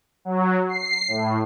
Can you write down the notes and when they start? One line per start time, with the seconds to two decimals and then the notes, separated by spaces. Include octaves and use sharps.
0.25 F#3
0.69 C7
1.08 A2